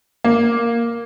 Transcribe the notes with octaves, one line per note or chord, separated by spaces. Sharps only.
A#3